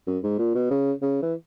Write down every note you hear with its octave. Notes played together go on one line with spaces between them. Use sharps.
F#2
G#2
A#2
B2
C#3
C#3
E3